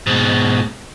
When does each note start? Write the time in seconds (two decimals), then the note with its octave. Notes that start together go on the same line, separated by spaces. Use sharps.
0.07 G#2 B2